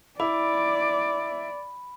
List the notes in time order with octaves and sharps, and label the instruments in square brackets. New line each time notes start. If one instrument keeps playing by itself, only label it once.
[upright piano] E4 [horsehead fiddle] D5 [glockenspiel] B5 [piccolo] D6